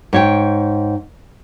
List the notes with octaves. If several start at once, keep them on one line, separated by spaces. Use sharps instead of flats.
G#2 C#5 G5